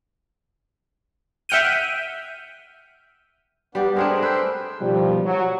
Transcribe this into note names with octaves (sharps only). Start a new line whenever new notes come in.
E5 F#5 G5 F6 G6 D#7
G3 B3 D4 G4
G#3 A3 C4 D4 G#4 A#4
B4 C5 G5 E6
B2 D#3 F3 G3
F#3